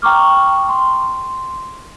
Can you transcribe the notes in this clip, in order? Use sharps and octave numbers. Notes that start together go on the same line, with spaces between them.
G5 A#5 C#6 D6 F6
C6